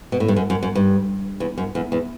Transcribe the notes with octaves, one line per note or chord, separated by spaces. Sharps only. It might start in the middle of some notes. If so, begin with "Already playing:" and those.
B2
A2
G2
F#2
F#2
F#2
G2
E2
F#2
E2
E2